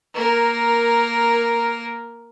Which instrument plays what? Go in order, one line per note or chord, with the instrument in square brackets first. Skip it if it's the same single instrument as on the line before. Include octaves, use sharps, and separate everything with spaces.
[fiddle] A#3 A#4